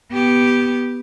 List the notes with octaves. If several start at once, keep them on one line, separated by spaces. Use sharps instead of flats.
B3 G4